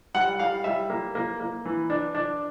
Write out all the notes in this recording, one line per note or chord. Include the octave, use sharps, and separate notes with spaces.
G3 F#5
G3 F5
G3 E5
A#3
A#3
A#3
E3
D4
D4